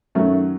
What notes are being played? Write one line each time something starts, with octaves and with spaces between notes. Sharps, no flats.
F#2 D#3 F#3 A3 C#4